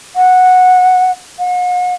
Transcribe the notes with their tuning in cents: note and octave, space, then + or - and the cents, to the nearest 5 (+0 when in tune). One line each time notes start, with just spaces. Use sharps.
F#5 -10
F#5 -45